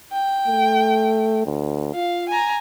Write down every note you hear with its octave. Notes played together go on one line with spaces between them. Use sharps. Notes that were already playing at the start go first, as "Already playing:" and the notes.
G5
A3
D2
F4 F5
G#5 A#5